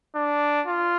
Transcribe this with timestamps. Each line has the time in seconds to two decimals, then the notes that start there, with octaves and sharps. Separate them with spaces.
0.15 D4
0.67 F4